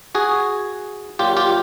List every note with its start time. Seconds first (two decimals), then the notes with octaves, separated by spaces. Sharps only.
0.15 F#4 G#4
1.19 A#2 F#3 F4 G4
1.37 F4 G4